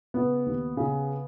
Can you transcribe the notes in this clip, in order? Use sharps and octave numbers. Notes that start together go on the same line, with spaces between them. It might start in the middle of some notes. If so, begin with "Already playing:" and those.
C#3 B3
D#2
C#3